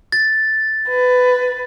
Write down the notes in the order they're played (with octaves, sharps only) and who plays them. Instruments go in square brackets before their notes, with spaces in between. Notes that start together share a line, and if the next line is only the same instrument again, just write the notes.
[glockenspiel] A6
[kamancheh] B4